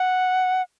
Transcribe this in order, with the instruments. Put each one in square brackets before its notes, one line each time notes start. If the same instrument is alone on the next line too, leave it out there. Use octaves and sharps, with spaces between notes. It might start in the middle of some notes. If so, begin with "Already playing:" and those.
Already playing: [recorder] F#5